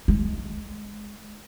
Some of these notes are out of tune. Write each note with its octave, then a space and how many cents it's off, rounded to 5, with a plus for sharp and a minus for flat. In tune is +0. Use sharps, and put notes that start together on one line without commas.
G#3 +5